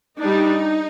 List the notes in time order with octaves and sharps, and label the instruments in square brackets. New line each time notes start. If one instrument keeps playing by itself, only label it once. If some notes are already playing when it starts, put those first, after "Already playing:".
[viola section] G3 D4 D#4